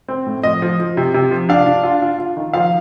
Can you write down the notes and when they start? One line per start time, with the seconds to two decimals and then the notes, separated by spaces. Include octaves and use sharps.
0.08 C4
0.26 A2
0.43 F3 D#5
0.62 F3
0.80 F3
0.97 C3
1.14 C3
1.31 F3
1.49 D4 F5
1.66 D4
1.84 F4
2.02 F4
2.19 F4
2.37 D#3
2.53 F3 F5